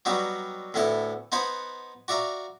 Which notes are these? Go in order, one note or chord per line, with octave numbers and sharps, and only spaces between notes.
F#3 G3 B3 D#4 F#4
D2 A2 B3 E4 A4
B3 D#4 C5 F#5 G#5 B5
F#4 D5 E5 F5 A#5